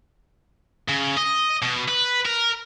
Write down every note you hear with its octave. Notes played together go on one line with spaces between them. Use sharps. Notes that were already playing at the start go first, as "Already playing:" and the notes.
C#3
D#5
B2
B4
A#4